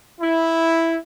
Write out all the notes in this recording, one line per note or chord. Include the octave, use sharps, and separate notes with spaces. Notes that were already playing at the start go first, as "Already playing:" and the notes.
E4